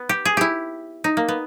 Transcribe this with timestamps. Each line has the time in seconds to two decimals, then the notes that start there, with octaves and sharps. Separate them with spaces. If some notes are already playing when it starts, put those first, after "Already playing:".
Already playing: B3
0.09 G4
0.25 G#4
0.37 E4 G4
1.04 D#4
1.17 A#3
1.28 B3